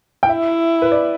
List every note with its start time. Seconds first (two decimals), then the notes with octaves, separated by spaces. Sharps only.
0.23 G5
0.29 E4 E5
0.82 B4
0.92 D5